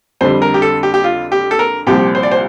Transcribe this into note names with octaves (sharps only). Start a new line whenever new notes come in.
F2 D3 G3 C5
A#4
G4
A4
G4
G4
F4
G4
A4
A#4
C2 A#2 F3 C4 G4
C5
D5
C5